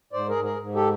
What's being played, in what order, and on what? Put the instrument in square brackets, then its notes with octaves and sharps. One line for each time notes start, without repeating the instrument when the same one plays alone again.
[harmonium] G#2 C5 D5
G#4 A#4
G#2
G#4 A#4
G#2
G4 A4